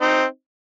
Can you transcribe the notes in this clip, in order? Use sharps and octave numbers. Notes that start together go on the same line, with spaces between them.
C4 D#4